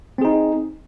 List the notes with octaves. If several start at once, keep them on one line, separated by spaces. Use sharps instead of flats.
C4 D#4 G#4